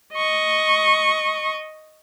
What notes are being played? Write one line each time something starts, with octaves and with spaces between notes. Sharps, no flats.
D#5 C#6